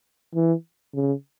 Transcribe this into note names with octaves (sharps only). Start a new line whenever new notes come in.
E3
C#3